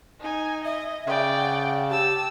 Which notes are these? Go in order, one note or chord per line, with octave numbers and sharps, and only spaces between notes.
D#4 G#5
D#5 E5
C#3 D5 G5
F#5
G4 A5 E6